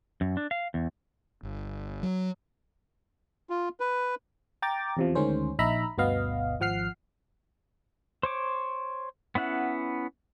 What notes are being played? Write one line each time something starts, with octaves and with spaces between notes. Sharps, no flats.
F#2
D4
F5
E2
G1
F#3
F4
B4
G5 A#5 D6 A6
E2 C3 F3
D2 D#3 G#3 C#4 C5
A#1 D#4 E5 A#5 B5
G1 D2 B2 B3 D#5 F5
G#1 F3 F#5 F6 C7
C5 C#5 D6
B3 C#4 E4 F#5